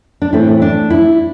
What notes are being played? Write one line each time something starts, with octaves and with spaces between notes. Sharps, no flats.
D4
A2 E3 A3 C4 E4
D4
E4